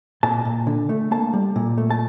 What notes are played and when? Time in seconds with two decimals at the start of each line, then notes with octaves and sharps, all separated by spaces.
0.23 A#2 A5
0.45 A#2
0.67 D3
0.89 A3
1.11 A#3 A5
1.33 G3
1.56 A#2
1.78 A3
1.90 A5